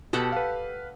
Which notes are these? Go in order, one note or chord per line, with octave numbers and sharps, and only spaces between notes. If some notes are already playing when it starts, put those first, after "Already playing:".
B2 G4 A4 F#5
B4 F5